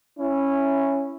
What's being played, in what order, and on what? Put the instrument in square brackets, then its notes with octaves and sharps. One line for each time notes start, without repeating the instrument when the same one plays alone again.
[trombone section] C#4 E4